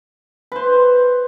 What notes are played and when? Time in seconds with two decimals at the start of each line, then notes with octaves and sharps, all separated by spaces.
0.52 B4 C5